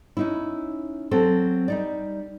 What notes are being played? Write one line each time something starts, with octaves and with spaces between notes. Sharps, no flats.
C#4 D#4 E4
F#3 C4 A4 C5
G3 D#4 D5